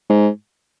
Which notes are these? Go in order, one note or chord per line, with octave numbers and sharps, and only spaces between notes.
G#2